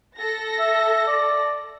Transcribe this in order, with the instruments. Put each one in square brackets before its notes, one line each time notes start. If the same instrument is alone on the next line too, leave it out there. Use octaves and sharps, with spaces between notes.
[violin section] A4 A#6
[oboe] E5
D5